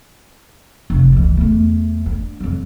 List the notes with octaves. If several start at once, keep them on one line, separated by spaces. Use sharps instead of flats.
F1
C#2 E3
E2 A3
D4
F2 F#3